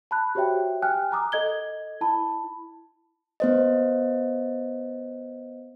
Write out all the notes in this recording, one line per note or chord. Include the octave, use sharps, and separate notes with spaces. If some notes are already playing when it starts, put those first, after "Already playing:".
A5 B5 F#6
F#4 G4 C5 C#5 E5 G5
G5 G#5 F6 F#6
G#5 A#5 D6 D#6
A4 D#5 G#6 G7
E4 A5 B5
B3 C5 D#5